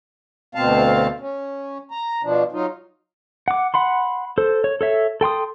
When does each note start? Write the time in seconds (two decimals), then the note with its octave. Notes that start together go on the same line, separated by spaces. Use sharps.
0.55 D2 B2 C4 F5 A5
1.20 C#4
1.91 A#5
2.23 B2 F3 D4
2.52 F#3 D#4 F4
3.48 F#5 D6
3.74 F#5 B5 C6
4.38 A4 C5
4.64 C#5
4.81 A4 C#5 E5
5.21 A4 G5 C6 D#6